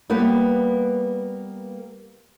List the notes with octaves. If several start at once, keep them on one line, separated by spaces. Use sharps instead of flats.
G3 A#3 B3 B4